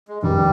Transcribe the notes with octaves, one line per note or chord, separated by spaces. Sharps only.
G#3
F1 D#2 D#3 G3